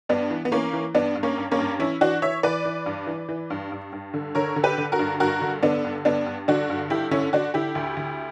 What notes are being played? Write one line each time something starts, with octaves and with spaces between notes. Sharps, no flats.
G2 B3 D4
E3
B3
E3 A#3 C#4
E3
G2 B3 D4
G2
A#3 C#4
G2
A#3 C#4
G2
E3 C#4 E4
E3 D4 F#4
E3 C#5 E5
E3 B4 D5
E3
G2
E3
E3
G2
G2
G2
D3
D3 A#4 C#5
D3
G4 B4
D3
F#4 A#4
G2
G2 F#4 A#4
D3
D3 B3 D4
G2
G2 B3 D4
G2
D3 D4 F#4
G2
D3 E4 G4
D3 C#4 E4
D3 D4 F#4
D3 E4 G4
D2
D2